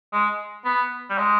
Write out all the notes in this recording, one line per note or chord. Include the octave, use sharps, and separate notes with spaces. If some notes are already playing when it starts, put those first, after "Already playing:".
G#3
B3
G3
G#3